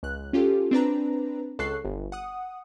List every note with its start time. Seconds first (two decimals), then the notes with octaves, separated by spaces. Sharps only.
0.03 C#2 F#6
0.33 C#4 F4 G4 A4
0.71 C4 D4 B4 A#5
1.59 C#2 A4 C#6 F#6 C7
1.85 G1
2.12 F#5 D#6